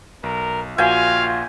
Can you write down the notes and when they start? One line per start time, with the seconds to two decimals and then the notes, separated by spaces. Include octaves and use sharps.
0.23 B1 A#4
0.78 A#1 A#3 F4 F#4 F5 G5 G#5